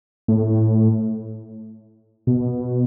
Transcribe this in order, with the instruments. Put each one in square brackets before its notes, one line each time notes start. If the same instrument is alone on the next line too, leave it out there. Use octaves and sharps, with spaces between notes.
[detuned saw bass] A2
B2